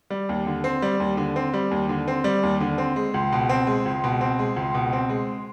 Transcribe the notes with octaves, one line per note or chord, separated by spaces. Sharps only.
G3
D#2
D3
C4
G3
D#2
D3
C4
G3
D#2
D3
C4
G3
D#2
D3
C4
G#3
C#2
B2
C4
G#3
C#2
B2
C4
G#3
C#2
B2
C4
G#3